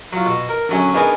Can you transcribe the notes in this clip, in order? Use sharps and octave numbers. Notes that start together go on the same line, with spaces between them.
F#3 F4
B2
A#4
D3 F#3 C#4
B3 D4 D#4 G#4 A#4 B4